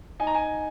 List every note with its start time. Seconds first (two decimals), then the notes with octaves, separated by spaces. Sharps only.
0.20 D#4 G#5
0.27 A#5
0.34 G#5